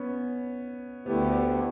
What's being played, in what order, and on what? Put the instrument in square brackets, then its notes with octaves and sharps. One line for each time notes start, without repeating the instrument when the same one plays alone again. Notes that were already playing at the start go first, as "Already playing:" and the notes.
Already playing: [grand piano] B3 C#4
[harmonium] D2 D3 A3 E4 G4 [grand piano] B3